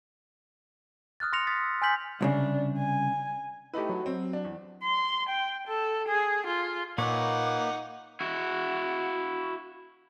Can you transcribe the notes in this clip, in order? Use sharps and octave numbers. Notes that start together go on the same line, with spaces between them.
D#6 F6 F#6 A6
C6 F6 A#6 C#7 F7
D#6 A6 B6
E6
G#5 C6 F6 G6 B6 F#7
C2 A2 C#3 D4
G#5
A3 D#4 E4 G4 B4
F#3
C4
D4
E2
C6
G5
A4
G#4
F4
A#2 A#3 D#4 B4 C#5 F#5 D6
E4 F#4